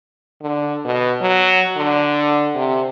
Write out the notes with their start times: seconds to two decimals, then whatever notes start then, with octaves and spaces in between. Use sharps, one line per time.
0.42 D3
0.85 B2
1.21 F#3
1.77 D3
2.55 C3